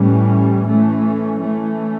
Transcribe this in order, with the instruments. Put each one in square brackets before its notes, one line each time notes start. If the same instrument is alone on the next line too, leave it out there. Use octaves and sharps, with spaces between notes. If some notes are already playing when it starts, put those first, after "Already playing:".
Already playing: [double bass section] A2 E3 G3 C#4
E3 A3 C#4
E3 A3 C#4